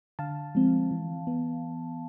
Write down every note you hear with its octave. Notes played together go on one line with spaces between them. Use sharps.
D3 F5 A5
F3 G#3 C4
E3
B3